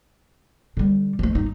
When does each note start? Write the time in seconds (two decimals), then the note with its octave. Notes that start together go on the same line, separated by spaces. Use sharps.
0.77 D3 G3
1.19 F3 A3
1.35 G1 D#4